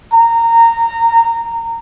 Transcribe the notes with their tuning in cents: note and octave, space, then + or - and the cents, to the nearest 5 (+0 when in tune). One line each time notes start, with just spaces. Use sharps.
A#5 -20